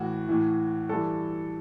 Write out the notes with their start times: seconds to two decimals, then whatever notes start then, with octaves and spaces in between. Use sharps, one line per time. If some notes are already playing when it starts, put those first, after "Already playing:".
Already playing: A2 E3 F#4
0.28 A2 E3
0.89 G2 E3 A4